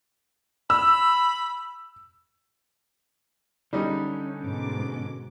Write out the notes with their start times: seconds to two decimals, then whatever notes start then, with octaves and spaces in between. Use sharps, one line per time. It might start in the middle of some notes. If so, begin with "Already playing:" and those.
0.70 B5 E6
3.73 D3 G3 C#4 D#4
4.41 G#2 B2 D6